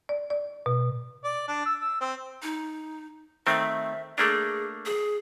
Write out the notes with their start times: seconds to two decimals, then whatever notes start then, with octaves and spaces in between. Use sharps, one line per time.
0.09 D5
0.30 D5
0.66 B2
1.24 D5
1.48 D4
1.66 E6
1.80 E6
2.01 C4
2.42 D#4
3.47 D#3 A3 C4 E5
4.18 A3 A#3 D4 G#4
4.85 G#4